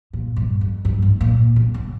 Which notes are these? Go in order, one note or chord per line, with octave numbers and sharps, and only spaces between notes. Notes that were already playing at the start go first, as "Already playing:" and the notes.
A#2
G2
F2
G2
G#2
A#2
C3
C#3